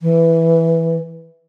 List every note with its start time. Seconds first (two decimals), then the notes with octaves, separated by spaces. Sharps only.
0.02 E3